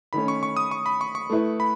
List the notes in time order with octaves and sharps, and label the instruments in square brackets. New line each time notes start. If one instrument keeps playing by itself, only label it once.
[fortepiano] D#3 A3 C#4 [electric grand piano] B5
[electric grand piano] C#6
C#6
D#6
C#6
B5
C#6
C#6
[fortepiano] A3 E4 B4
[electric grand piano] B5